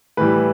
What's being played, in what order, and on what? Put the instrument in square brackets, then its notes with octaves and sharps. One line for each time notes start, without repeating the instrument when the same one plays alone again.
[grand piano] A2 E3 G3 B4